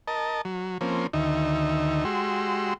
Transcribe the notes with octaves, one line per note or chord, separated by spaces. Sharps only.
A#4 D#5 A5
F#3
F3 A#3 C4 C#4
D2 D#3 D#4 E5
G#3 F#4 G4 C6 E6